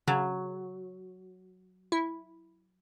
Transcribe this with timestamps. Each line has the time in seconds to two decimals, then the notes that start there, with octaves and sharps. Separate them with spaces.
0.08 C#3 F#3
1.92 E4